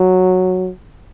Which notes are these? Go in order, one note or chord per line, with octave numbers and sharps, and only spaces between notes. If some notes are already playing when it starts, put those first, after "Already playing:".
Already playing: F#3